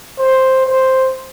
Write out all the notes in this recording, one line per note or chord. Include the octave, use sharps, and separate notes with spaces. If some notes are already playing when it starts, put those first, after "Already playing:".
C5
C5